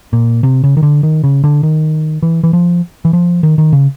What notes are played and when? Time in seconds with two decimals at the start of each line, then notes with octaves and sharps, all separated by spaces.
0.13 A#2
0.43 C3
0.64 C#3
0.77 D#3
0.83 D3
1.03 D#3
1.24 C#3
1.44 D3
1.63 D#3
2.23 E3
2.43 E3
2.53 F3
3.05 E3
3.13 F3
3.43 D#3
3.58 D#3
3.73 C#3